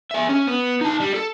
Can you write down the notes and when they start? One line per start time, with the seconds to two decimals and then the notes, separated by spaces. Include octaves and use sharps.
0.11 G#4 E5
0.29 C#4
0.47 B3
0.81 D#4 A5
1.00 G3
1.14 A4